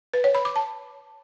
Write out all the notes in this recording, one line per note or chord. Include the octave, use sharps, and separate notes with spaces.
B4
C#5
B5
D6
A5